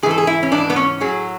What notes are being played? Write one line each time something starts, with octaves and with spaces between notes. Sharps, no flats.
G#2 E3 G#4 A4
G#4
E4
C#4
G#2 E3 D4
B3
C#4
A2 F#3 G#4